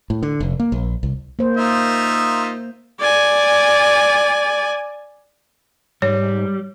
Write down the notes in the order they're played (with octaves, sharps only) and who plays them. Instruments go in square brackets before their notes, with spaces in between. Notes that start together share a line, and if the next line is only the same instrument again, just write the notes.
[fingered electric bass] A2
D3
F1
A#3
A#1
C2
[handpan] A#3 C5
[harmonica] D#4 F4 E5
[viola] D5 G#5
[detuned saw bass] G#2 [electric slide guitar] G3 [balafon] C#5